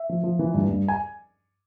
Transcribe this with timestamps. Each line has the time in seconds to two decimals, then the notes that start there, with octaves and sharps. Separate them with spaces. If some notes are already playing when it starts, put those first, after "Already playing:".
Already playing: E5
0.09 F3
0.24 F3
0.39 E3
0.54 G2
0.69 G2
0.88 G#5